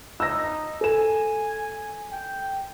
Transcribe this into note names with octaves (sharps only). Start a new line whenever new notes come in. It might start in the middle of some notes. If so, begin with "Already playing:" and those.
D#4 E6 A#6
A4 G#5 E7
G5